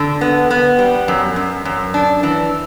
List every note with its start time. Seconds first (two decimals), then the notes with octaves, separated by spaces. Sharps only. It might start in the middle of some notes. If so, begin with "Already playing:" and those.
Already playing: D3
0.21 B3
0.51 B3
0.79 G3
1.08 F#2
1.36 F#2
1.65 F#2
1.94 D4
2.23 E3